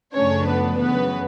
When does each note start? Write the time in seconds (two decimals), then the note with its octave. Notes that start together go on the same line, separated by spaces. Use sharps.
0.15 F#2 C#3 F3 A3 C#4 D4 C#5
0.48 B3 B4
0.79 F#2 C#3 E3 B3 B4